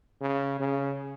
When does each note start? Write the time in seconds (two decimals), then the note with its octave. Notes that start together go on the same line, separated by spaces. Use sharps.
0.21 C#3
0.60 C#3